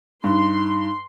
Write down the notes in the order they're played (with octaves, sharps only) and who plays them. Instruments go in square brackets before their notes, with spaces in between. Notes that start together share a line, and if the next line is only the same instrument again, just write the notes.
[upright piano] G2 [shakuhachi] D#4 [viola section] C6